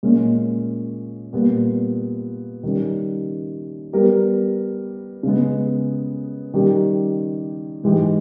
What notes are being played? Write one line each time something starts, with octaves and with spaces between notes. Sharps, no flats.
A#2 G#3 C#4
A#2 G3 B3
D#3 G3 C#4
G3 B3 G4 A#4
C#3 G#3 B3
D#3 G3 C#4 G4
G#2 E3 G#3 D#4 G4